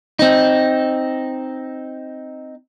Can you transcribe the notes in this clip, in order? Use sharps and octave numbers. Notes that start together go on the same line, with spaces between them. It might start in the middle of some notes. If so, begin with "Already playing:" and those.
C4 D#4